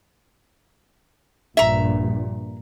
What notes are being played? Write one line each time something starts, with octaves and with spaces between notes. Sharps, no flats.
A#1 G2 A#2 E5 A#5